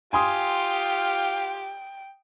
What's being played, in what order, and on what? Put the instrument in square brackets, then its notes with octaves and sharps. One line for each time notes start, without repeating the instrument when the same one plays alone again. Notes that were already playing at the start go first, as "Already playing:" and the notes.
[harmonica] F4 G4 [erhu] G5 [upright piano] G#5 C6 D#6